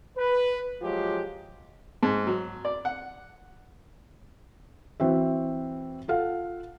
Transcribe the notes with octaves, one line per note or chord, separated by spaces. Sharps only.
B4
F3 F#3 G#3 F4 G4
G#2
F#3
D5
F#5
E3 C4 F#4 E5
F4 A4 F5 F#5